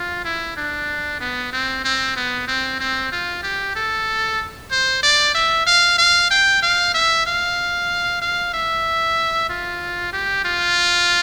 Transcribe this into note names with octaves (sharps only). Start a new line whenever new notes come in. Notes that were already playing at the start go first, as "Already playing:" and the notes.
Already playing: F4
E4
D4
B3
C4
C4
B3
C4
C4
F4
G4
A4
C5
D5
E5
F5
F5
G5
F5
E5
F5
F5
E5
F4
G4
F4